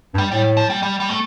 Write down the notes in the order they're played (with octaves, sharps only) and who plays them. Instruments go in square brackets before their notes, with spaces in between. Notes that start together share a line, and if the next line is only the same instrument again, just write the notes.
[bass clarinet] G2
[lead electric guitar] G3
[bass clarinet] A2 [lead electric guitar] G3
[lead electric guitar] F3
G3
G3
G3
A3